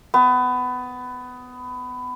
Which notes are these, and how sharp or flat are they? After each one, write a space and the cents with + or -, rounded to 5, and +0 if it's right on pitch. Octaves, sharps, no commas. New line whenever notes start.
B3 +20